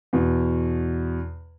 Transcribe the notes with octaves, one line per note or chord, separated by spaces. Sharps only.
E2 B2